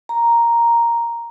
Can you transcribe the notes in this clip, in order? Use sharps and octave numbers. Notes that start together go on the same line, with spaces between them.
A#5